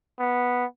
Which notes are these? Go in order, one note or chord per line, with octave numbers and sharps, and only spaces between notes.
B3